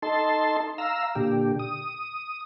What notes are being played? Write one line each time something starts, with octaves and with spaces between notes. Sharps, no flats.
D#4 A4 A5 C6
F5 A#5 E6
A#2 D3 G4
D#6